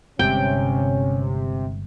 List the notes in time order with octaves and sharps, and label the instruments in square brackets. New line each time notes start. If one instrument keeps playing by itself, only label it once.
[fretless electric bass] G1 G2 G#3 [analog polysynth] C3 [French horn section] C#4 C#5 [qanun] G5